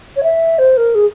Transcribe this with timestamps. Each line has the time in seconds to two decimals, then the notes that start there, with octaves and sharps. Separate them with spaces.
0.16 C#5
0.23 E5
0.58 C5
0.77 A#4
0.94 G#4